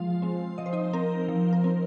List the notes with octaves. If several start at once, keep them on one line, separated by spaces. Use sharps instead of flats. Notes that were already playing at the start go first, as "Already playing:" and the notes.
Already playing: F3 G#3 F4 F5
G#3 C4
F3 D#5
C5
D#4 D#5
C4 A#4
F3
A#4
C4